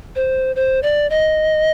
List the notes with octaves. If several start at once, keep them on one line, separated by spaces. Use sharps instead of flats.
C5
C5
D5
D#5